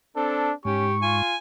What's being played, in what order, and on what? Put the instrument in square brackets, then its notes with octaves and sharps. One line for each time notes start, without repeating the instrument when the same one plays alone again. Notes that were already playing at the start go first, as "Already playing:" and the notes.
[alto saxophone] C4 [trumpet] D4 [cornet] A4
[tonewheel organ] G#2 [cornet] C#4 [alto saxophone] G4 [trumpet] C#6
[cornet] F4 [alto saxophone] G#5